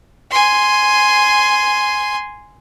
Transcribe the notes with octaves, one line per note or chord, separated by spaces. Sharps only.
G#5 C6